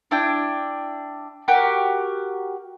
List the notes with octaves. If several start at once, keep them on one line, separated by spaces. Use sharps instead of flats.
D4 E4 G5
F#4 G4 A#4 G5